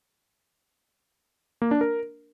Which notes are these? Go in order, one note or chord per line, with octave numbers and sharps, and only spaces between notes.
A#3
D4
A#4